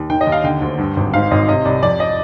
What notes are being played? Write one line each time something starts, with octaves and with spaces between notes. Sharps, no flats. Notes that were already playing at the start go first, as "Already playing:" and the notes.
Already playing: D#2
D#3 G5
D#5
D#2
F5
D3 G5
D2
G2
G#1
G#2 F5
G#1 D#5
C3 D#5
C2 D5
F2 D5
D#5